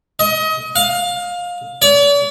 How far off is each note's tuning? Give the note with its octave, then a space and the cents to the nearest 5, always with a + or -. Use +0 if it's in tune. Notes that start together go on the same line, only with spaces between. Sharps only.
D#5 +30
F5 +20
D5 -45